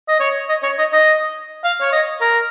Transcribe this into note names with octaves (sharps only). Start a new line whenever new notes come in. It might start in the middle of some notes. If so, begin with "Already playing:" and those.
D#5
C#5
D#5
C#5
D#5
D#5
F5
C#5
D#5
A#4